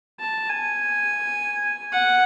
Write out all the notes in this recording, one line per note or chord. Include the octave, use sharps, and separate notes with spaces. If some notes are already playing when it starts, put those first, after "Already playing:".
A5
G#5
F#5